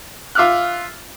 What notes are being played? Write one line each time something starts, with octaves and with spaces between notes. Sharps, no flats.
F4 E5 D6 F6 F#6